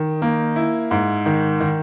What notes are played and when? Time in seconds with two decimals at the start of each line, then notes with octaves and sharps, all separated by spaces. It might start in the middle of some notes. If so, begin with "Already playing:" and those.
Already playing: D#3
0.22 A#3
0.56 E4
0.91 G#2
1.26 D#3
1.61 D#3